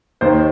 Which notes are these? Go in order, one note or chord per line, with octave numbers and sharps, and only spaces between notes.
D#2 D#3 A#3 C5